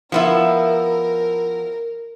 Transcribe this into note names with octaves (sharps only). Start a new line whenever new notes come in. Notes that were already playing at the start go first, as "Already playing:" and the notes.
F3 B3 E4 A#4